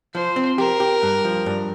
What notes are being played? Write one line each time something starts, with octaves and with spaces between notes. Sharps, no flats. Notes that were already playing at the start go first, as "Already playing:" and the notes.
F3 C5
C4
G4 A#4
G4
G2
F3
G2